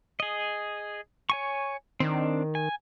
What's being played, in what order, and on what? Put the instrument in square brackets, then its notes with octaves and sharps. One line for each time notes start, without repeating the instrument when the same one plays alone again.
[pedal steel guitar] G#4 D#5
C#5 G#5 C#6
[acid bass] D#3 [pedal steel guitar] C4 D4
[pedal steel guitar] G#5